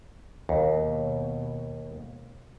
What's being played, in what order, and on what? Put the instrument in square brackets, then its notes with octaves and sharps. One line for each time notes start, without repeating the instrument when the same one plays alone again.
[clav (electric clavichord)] D#2 [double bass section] B2